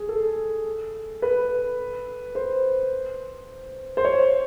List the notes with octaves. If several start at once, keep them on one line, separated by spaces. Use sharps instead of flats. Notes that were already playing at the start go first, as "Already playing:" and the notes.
Already playing: G#4
A4
B4
C5
C5
C#5